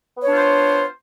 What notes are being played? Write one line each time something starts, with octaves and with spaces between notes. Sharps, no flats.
B3 D4 F4 C5 C#5